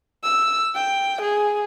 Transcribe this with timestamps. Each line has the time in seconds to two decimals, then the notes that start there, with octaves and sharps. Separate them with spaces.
0.23 E6
0.75 G5
1.21 G#4